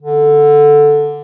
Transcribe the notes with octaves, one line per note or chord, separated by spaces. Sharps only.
D3